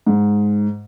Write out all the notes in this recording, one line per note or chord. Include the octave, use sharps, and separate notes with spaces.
G#2